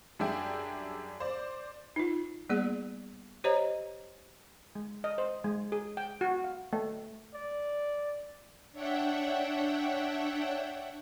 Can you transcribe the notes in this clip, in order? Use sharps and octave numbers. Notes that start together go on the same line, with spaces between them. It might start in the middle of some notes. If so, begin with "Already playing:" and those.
F#2 G3 D4 G#4 E5 G5
C5 D5
D#4 F4
G3 A#3 B3 G#4 D5
G4 C5 C#5 D#5 A#5
G#3
D#5
C5
G#3
G#4
G5
F#4
F5
A3
D5
D4 C#5 E5 F#5 G5